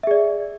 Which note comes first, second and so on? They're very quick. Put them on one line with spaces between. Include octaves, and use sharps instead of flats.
E5 G#4 D5